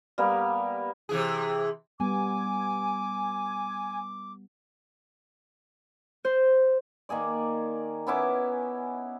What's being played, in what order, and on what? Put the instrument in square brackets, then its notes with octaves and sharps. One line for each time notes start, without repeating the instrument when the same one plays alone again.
[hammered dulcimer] G3 A#3 B3
[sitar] C3 E3 G#4
[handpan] G3 B3 [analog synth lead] G#5 [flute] D6
[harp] C5
[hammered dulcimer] D#3 A#3 G#4 D5
B3 C#4 E4 D6